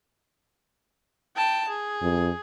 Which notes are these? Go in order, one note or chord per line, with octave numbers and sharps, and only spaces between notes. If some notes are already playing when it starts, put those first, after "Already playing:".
G5 A5
G#4
F2